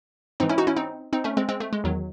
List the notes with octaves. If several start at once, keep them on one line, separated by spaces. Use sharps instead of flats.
G#2 E3 C4 D#4
C#4 E4
D#4 F#4
C#4 E4
C4 D#4
C4 D#4
A3 C#4
G#3 C4
G#3 C4
A3
G#3
E2 D#3 F#3